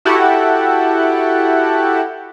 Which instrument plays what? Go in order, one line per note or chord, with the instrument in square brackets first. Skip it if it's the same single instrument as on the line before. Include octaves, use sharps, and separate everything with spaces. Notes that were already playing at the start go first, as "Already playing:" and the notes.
[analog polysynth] E4 F#4 G4 A4 F#5